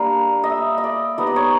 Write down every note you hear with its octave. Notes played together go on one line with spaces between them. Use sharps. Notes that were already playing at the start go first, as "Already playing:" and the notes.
Already playing: G3 A#3 D4 F5
D#5
E5
D#5
D5
G3 B3 D#4 D#5
D5
C#5